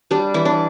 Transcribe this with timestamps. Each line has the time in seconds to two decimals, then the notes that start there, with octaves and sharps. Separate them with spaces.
0.11 G3 D4
0.34 E3 E4
0.45 D4